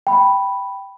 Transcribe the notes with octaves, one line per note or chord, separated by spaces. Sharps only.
G5 B5